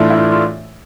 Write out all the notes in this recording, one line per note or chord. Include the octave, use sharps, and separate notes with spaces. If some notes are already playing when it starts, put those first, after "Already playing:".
Already playing: A2 E3 A3 D4 E4 F4
E4
F4
F4